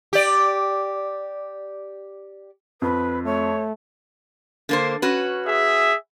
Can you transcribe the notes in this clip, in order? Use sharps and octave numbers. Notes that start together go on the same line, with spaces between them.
G4 D5
F2 B4
A3 C#5
D3 A#3 C5
C#4 F#4 B4
G#4 E5